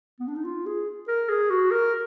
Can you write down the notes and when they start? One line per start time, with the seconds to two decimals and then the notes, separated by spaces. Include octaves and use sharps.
0.20 B3
0.28 D4
0.36 D#4
0.44 F4
0.66 G#4
1.08 A#4
1.29 G#4
1.50 F#4
1.71 A#4